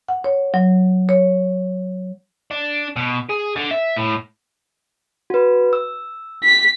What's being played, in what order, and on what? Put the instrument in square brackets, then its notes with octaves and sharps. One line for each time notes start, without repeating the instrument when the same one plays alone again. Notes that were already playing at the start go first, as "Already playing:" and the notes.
[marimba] F#5
C#5
F#3
C#5
[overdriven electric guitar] D4
B2
G#4
D3
E5
A2
[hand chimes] F#4 B4
E6
[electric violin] B6